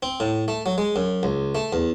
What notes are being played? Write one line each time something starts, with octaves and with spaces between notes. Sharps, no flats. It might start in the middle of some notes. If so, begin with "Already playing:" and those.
C4
A2
A3
F#3
G#3
F#2
C#2
A3
E2